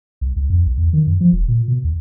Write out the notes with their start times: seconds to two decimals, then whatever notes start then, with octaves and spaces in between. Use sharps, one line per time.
0.21 C2
0.36 C#2
0.50 F2
0.66 B1
0.77 E2
0.93 D#3
1.07 F#2
1.21 F3
1.33 E1
1.48 A#2
1.68 B2
1.84 D#2